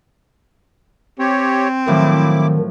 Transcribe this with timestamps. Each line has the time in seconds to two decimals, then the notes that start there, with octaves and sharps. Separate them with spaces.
1.19 C4 G4 C#5
1.87 A2 D#3 F3 F#3 E4 D6